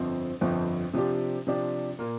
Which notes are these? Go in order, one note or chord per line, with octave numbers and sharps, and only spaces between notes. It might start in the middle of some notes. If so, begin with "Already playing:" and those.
Already playing: G1 F2 F3 C4
G1 F2 F3 C4
C3 F3 D4 G4
C3 F3 D4 G4
A#2 A#3